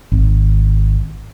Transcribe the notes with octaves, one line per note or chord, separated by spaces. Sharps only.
G#1